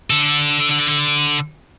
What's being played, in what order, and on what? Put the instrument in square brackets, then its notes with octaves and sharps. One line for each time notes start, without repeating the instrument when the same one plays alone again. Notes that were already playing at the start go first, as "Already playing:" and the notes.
[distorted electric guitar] D3 A4